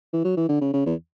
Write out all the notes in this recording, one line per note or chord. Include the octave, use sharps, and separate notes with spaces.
E3
F#3
E3
D3
C#3
C#3
E2